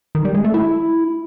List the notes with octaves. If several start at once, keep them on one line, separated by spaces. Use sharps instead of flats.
D#3
G3
G#3
A3
E4